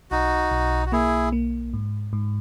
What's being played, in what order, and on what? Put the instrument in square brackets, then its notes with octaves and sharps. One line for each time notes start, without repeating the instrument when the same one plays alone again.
[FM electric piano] B1 [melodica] D#4 F#4
[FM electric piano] B1
[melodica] F#4
[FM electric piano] A#3 [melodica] E4 G#4
[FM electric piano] A#3
G#2
G#2